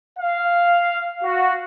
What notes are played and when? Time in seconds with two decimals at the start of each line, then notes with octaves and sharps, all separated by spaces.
0.19 F5
1.24 F#4